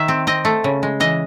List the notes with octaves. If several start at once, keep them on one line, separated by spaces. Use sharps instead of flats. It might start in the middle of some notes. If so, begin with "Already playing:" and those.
Already playing: D#3 E5
C4
C4 D#5
A3
C#3
G#3
E3 D#5